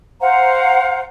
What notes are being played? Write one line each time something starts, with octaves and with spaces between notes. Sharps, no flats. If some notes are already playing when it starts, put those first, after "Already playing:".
C5 F5 F#5 A#5